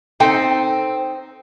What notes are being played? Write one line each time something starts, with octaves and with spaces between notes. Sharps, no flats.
C4 D#4 A4 G5